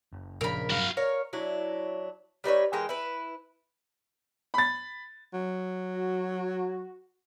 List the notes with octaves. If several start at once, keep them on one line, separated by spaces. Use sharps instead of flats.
F#1
A#1 C#3 A#4 B5
G2 F#3 F#4 F5
A#4 C#5 F5
F#3 D4 E4
G3 D#4 B4 C#5
E3 G#3 A#4 G5
E4 B4
B5 A6
F#3
F#4